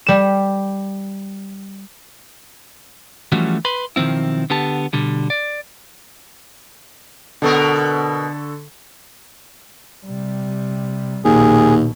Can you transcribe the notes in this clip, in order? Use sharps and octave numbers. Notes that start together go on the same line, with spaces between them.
G3 E7
E3 F3 G3 A3 C#4 F#4
B4 B5 C6
B1 D#3 F3 C4 E4
D3 B3 G4 A5
B2 D3 G3
D5
B2 D3 B3 A4 A#4 C#6
C3 G3
A#1 D#2 B2 G#4